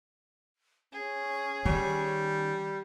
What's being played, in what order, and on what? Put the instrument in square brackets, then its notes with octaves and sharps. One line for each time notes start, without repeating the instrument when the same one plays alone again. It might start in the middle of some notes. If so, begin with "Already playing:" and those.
[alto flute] C#4 [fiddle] G#4
[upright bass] D#3 [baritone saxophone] G3